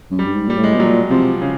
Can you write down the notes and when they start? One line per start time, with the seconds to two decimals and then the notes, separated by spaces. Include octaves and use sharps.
0.11 F#2
0.19 G3
0.26 G2
0.34 G#2
0.47 A#2 G3
0.57 A2
0.64 G#3
0.72 B2 G3
0.80 A#2 F#3
1.11 C3 F3
1.42 C#3